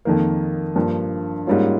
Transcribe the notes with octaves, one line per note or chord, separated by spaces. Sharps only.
F2 D#3 A#3
G2 F3 A#3
G#2 G3 A#3 C#4 F4